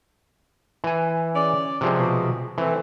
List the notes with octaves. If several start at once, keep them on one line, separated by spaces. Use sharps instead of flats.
E3 G#5
C#4 G#4 D5
C3 F3 G#3
B2
E3 A3 C4